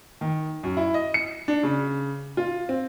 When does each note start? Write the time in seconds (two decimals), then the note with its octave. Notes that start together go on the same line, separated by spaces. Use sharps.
0.21 D#3
0.63 F#2
0.77 E4
0.94 D#5
1.14 C#7
1.48 D4
1.63 C#3
2.37 F4
2.69 C4